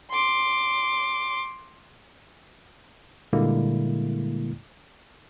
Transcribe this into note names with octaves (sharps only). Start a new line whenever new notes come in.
C6 D6
A#2 D3 G3 G#3 A#3 E4